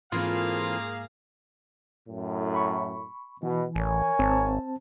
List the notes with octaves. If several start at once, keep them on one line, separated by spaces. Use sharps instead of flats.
G#2 E3 A#3 C4 F4 G#4 A4 F5
F#2 A2
B5 C#6
B2 E3
A1 A#4 C#5 G#5
G#1 C4 C5 A5